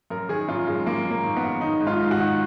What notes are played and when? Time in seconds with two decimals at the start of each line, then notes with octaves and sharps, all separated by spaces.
0.10 F#2 A#4
0.29 D#3 G#4
0.48 F#2 F4
0.67 F#2 G#3
0.86 F#2 A#3
1.05 F#2
1.11 A#3
1.23 D#3
1.36 B3
1.43 F#2
1.61 D#3 D#4
1.80 G#2
1.87 F4
1.99 G#2
2.11 F#4
2.18 D#3